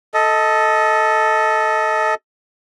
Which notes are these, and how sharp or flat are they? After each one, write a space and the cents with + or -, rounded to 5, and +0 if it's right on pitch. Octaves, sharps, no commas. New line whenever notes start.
A4 +0 D#5 +20